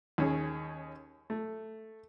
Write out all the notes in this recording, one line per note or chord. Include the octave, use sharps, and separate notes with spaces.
D#2 C#4 G#4
A3